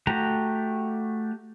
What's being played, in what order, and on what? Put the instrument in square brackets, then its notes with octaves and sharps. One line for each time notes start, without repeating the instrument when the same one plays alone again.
[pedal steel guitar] A3 F#4 G4 A#5